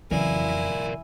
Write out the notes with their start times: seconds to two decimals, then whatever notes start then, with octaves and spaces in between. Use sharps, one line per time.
0.11 F2 C#3 E3 F#3 E4 A#4 D5 G#5